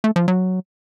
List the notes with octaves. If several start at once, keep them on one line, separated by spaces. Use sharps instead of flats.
A3
F3
F#3